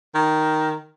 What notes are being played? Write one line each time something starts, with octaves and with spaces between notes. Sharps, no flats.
D#3